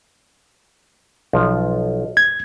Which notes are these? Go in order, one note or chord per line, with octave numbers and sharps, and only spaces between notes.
B1 F3
G#6